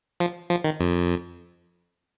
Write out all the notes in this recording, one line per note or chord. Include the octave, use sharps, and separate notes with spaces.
F3
F3
D#3
F2